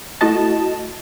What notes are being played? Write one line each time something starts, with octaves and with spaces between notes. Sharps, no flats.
A3 E4 F#4 D#5 A5